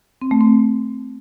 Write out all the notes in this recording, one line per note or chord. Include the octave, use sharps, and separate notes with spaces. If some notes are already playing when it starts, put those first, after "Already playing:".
C4
A3
C4